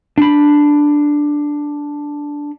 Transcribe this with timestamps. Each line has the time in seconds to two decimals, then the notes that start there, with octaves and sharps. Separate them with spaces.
0.18 D4 B5